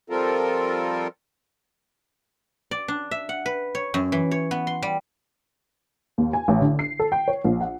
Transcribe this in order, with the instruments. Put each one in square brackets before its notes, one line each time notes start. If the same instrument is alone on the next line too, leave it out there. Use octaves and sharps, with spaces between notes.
[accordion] F3 G3 C4 F4 A4 A#4
[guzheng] D5
D4
E5
F#5
B4
C#5
F#2
E3
C#5
B3
C6
G3
[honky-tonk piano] D#2
G#5
A1
D3
C7
A4
G5
C#5
A#1
F#5